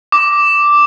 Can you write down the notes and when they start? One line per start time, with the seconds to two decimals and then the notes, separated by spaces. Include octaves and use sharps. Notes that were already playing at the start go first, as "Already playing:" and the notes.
0.12 D6